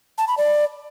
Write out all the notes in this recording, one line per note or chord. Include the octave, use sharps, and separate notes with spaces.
A5
B5
D5